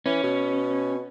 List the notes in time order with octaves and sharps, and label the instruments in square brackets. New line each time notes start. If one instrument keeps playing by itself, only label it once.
[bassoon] E3 [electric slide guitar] C#4
[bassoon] B2